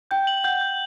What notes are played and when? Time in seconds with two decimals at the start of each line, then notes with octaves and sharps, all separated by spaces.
0.11 G5 G6
0.27 F#7
0.44 F#5 G6
0.61 G6